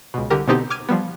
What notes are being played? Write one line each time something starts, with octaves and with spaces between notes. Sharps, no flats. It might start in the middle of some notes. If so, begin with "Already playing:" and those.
C#2 B2
C2 D3 G4 A#4
B2 D3 B3 C4 D#4 G4
D6 F6 G#6 D#7
F3 G3 B3